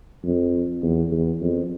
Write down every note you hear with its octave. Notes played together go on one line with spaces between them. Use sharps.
F2
E2
E2
F2